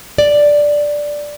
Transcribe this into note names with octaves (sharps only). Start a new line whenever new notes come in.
D5